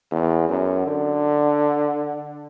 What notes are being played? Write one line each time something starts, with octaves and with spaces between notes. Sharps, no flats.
E2
F#2
D3